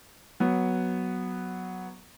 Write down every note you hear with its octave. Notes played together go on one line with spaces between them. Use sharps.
F#3 B3